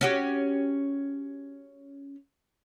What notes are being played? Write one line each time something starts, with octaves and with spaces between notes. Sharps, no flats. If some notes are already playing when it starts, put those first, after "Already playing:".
C#4 F#4 G4